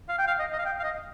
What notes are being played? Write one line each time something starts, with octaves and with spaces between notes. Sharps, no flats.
F5
G5
F5
D#5
D#5
F5
G5
F5
D#5